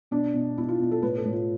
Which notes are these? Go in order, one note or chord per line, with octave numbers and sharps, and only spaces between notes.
B2 D4
B2
B2 E4
F4
B2
A4
A2 B4
A4
A2
F4